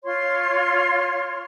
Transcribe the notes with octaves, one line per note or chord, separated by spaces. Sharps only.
F4 C#5 C6